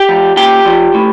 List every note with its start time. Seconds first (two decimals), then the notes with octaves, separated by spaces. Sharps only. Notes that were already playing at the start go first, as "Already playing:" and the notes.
Already playing: G4 G5
0.09 F3
0.37 A#2 G4 G5
0.65 F3
0.94 A2